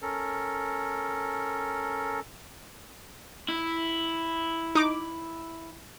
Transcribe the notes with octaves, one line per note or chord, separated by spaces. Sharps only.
C#4 A4 A#4
E4
D#4 D6